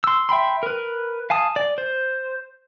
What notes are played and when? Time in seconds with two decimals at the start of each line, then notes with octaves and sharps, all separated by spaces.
0.04 C6 E6
0.29 E5 G5 B5 C6
0.63 A#4 B4
1.30 F5 G#5 A5 D#6
1.56 D5
1.78 C5